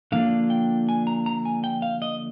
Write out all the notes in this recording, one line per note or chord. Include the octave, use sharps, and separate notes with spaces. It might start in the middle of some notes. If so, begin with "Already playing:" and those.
D3 F3 A#3 D4 F4 F5
G5
G#5
A#5
A#5
G#5
G5
F5
D#5